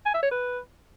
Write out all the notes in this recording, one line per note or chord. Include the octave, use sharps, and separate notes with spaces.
G#5
E5
C#5
B4